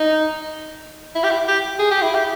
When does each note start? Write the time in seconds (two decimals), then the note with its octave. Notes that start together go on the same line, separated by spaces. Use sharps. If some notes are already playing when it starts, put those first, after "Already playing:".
Already playing: D#4
1.15 E4
1.24 G4
1.30 E4
1.48 G4
1.79 G#4
1.91 G4
2.02 E4
2.14 G4